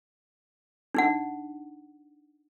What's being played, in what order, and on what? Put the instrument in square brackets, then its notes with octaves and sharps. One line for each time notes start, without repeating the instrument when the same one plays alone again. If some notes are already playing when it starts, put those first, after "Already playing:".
[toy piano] D4 D#4 F#5